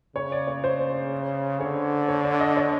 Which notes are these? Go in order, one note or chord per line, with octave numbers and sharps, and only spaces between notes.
C#3 C#5
D5
C#5
C5
D3 C#5
C#5
D5
D#5
C#5